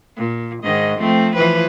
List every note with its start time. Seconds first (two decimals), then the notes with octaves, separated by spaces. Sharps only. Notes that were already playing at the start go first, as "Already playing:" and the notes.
0.17 A#2
0.63 G#2 D#3 D#5
0.99 F3 A3 C4
1.35 E3 F3 B4